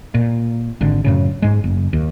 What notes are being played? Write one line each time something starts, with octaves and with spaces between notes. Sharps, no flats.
A#2
G#1 D3
F#2 A2 C#3
G#2 G#3
F#1
D#2